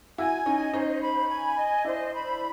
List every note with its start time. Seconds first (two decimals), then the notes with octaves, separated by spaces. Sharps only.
0.18 E4 F#4 G#5
0.46 C#4 D#4 D#5
0.73 C#4 D#4 C5
1.01 B5
1.29 G#5
1.56 D#5
1.84 D4 E4 C5
2.13 B5